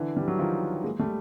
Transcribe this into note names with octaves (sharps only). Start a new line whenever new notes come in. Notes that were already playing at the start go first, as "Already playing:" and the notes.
Already playing: D3 E3
G3
F#3
D#3 F3
G#3 A#3
G3 A3